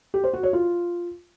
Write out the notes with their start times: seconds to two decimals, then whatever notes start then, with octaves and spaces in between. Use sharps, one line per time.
0.14 G4
0.24 C5
0.33 F#4
0.43 C#5
0.53 F4